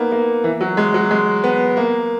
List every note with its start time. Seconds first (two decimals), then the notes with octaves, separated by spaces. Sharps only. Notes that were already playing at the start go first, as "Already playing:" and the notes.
Already playing: A#3 B3 D#4
0.12 A#3
0.44 E3
0.61 F#3
0.77 G#3
0.94 F#3
1.11 G#3
1.44 B3
1.77 A#3